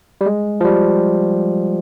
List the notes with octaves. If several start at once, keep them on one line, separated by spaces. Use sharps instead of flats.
G3
G#3
F3
G3